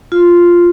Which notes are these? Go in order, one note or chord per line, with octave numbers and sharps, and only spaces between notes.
F4